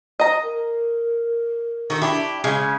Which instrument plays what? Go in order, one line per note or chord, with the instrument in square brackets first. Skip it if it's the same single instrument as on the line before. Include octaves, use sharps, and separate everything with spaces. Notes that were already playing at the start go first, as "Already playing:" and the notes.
[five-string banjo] D#5 A#5
[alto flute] A#4
[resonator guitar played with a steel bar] D#3 [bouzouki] F#4 A4
[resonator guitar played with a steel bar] D4 E4 [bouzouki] G4
[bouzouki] C#3 [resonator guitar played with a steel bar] G#3 C#4